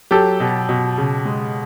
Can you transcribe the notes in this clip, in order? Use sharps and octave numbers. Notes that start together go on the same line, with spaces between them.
F#3 G4 A4
B2
B2
C#3
G#3